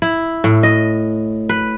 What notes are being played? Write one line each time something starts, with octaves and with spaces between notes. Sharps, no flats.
E4
A2
D#5
B4